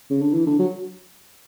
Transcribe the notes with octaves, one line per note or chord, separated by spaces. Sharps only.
C#3
D3
E3
D3
F#3